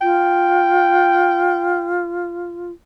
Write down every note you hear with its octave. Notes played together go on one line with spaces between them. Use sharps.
F4 G5